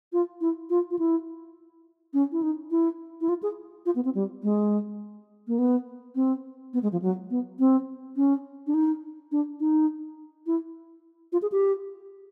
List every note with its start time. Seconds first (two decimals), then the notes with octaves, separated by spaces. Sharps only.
0.13 F4
0.41 E4
0.70 F4
0.91 F4
0.99 E4
2.14 C#4
2.32 E4
2.42 D#4
2.71 E4
3.21 E4
3.29 F4
3.43 G#4
3.86 F4
3.96 B3
4.05 C4
4.15 G3
4.43 G#3
5.48 A#3
5.58 B3
6.15 C4
6.73 B3
6.83 G#3
6.92 F3
7.02 F#3
7.30 B3
7.59 C4
8.16 C#4
8.67 D4
8.74 D#4
9.32 D4
9.60 D#4
10.46 E4
11.32 F4
11.42 G#4
11.52 G4